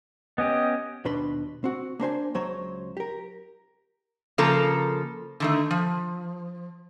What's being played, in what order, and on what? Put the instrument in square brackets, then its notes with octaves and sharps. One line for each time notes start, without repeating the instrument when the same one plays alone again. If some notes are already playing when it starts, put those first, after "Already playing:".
[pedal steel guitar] B3 C#4 G4 [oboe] D#5
[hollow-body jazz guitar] D#2 B2 D4 B4 B5 C6
C4 F#4
A#3 D4 C5 G#5
C#2 F#3 C5 C#5
G4 A#4
[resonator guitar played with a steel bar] C#3 F3 A#3 A4 A#5
D3 D#3 A3
F3